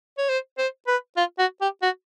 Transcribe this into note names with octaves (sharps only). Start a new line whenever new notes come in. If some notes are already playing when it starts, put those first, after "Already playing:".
C#5
C5
C5
B4
F4
F#4
G4
F#4